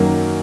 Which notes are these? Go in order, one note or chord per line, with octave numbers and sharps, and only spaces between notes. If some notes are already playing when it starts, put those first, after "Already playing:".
Already playing: F#2 D#3 F#3 A#3